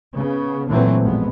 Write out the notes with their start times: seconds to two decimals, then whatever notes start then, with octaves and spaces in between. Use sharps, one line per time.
0.15 C#3 B3
0.67 A#2 D3 E3 F#3 A3 C4
1.01 A1 F2 G#3 B3